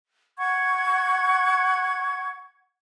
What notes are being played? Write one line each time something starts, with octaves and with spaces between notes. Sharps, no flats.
F#5 C#6 G#6